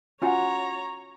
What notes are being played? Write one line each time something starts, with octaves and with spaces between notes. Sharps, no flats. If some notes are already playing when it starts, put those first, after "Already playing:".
C#4 F4 F#4 C#5 F#5 G#5 A#5